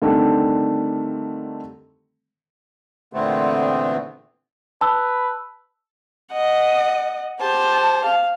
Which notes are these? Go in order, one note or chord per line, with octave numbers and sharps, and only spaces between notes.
D3 D#3 G3 A3 C4
E2 A#2 D3 A3 B3 C4
B4 A5 E6
D#5 F#5
G4 C5 A5
F5